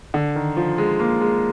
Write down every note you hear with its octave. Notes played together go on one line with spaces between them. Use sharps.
D3
D#3
F3
G#3
A#3
G#3